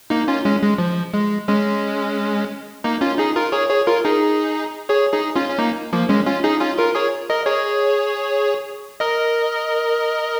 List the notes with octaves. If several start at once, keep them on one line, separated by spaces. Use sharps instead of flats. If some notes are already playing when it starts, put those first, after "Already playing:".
A#3 D#4
C#4 F4
G#3 C#4
G#3
F3
G#3
G#3 C#4
A#3 D#4
C#4 F4
D#4 G#4
F4 A#4
G#4 C#5
G#4 C#5
F4 A#4
D#4 G#4
G#4 C#5
D#4 G#4
C#4 F4
C#4
A#3 D#4
F3 A#3
G#3 C#4
C#4 F4
D#4 G#4
C#4 F4
F4 A#4
G#4 C#5
A#4 D#5
G#4 C#5
A#4 D#5